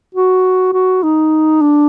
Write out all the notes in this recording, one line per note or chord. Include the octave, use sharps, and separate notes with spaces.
F#4
F#4
D#4
D4